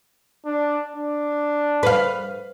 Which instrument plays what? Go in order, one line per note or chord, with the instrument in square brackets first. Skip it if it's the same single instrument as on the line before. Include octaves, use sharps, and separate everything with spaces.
[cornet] D4
D4
[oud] B4 F5